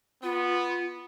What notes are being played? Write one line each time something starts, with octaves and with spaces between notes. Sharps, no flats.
B3 F4